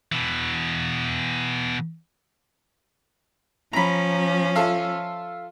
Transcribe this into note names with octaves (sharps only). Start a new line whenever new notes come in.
B2 E3
F3 C#4 A#5 B5
F4 A4 E5